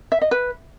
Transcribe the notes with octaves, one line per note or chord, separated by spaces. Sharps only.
E5
D#5
B4